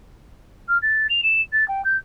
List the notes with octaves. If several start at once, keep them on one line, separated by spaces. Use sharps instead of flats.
F6
A6
F7
E7
A6
G5
G6